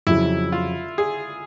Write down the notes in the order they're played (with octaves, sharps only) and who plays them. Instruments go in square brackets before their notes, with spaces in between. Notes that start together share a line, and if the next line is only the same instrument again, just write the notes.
[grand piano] F2 C#3 F#3 [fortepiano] E4
[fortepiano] F4
G#4